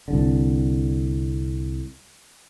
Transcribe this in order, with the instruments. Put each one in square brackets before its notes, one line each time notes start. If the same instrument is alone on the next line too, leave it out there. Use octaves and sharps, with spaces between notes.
[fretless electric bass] C2 D3